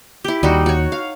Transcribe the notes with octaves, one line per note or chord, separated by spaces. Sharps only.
E4 G4
D#2 G3 D#4 F#4
F#4 C#5
F5